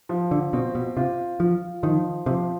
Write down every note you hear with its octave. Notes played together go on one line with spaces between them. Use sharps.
F3
D3
B2 C4
B2
C3 F4
F3 F4
D#3 F3
C3 F3